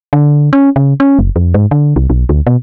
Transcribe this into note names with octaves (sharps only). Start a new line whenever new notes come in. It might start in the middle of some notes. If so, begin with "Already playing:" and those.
D3
C#4
C#3
C#4
F#1
F2
G#2
D3
C2
B1
D2
B2